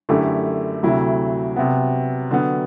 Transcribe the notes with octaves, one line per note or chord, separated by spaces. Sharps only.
F#2 D3 A3 E4 G4
D2 C3 F#3 A3 E4
C3 F#3 B3
D3 F#3 B3